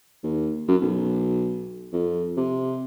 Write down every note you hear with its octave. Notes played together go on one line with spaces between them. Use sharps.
D#2
F#2
B1
F2
C3